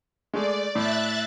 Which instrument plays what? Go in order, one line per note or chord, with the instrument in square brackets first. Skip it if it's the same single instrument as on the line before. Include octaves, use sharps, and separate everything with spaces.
[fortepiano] G#3 A3 [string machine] D5
[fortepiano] A2 [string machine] E5 F#6 A6